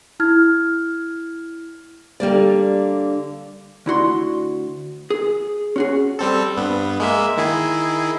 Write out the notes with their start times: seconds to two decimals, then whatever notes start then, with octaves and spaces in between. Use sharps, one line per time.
0.20 E4 F6 G#6
2.20 D3 G3 A#3 D5
3.86 D2 E4 F#4 C6
5.10 G#4
5.76 C#4 F#4 G#4
6.19 G3 C4 A4
6.57 G2 B3
7.00 G#3 A#3 E5
7.38 D#3 E4 G#4